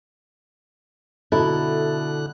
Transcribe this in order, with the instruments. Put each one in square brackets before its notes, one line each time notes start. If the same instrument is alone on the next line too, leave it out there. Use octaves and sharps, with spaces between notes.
[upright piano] B2 A#5 [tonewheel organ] D3 F#6 [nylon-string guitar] E4 [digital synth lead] A4